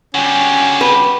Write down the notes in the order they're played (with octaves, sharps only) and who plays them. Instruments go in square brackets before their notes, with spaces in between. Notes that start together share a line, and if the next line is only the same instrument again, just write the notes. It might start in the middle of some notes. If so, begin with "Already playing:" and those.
[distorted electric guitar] D3 G3 [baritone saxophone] C#4 [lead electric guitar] F#4 G4
[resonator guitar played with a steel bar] B4